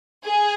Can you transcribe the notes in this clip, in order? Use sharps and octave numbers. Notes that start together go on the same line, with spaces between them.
G#4